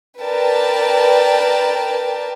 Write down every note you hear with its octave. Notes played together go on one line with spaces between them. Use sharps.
A#4 B4 D5 G5 A5